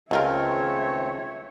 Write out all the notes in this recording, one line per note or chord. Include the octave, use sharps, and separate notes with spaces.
C#2 G#3 A3 C4 F4 A#4 C#5 E5